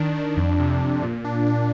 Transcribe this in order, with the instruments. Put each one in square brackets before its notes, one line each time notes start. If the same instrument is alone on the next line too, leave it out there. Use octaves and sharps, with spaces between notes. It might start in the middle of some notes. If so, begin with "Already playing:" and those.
Already playing: [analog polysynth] D#3 D4
D4
F2
C3
F2
A#2
D4
D4